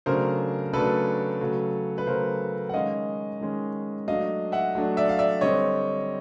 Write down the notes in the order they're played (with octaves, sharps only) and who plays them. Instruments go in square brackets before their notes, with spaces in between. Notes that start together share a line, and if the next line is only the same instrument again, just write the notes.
[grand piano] C#3 F#3 A3 D4 A#4 C5
C#3 F#3 A3 D4 A4 B4
C#3 F#3 A3
B4
C#3 F#3 A3 A#4 C5
F#5
D#3 G#3 C#4 D#5 F5
D#3 G#3 C#4
F#3 A3 D4 D#5 F5
E5 F#5
F#3 A3 D4
D5 E5
F5
D5 E5
D3 G3 C4 C#5 D#5